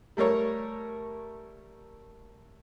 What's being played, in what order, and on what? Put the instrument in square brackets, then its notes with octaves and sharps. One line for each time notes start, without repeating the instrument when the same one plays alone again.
[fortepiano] G3 A3 A#4 C#5